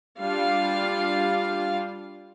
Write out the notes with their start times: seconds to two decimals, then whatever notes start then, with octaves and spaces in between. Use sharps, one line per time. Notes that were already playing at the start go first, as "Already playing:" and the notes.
0.19 G3 D4 F4 F5